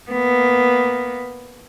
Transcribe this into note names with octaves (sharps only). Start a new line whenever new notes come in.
A#3 B3